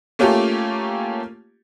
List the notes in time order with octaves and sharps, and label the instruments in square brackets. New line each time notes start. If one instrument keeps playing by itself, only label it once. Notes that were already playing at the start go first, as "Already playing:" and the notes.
[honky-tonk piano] A3 A#3 C#4 F4 G4 A4